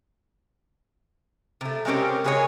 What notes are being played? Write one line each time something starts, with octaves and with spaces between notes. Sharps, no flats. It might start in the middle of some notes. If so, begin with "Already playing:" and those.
C3 A3
G#3 A3 C4 C#4 G4 A#4
C#3 G#3 G#4 A#4 C#5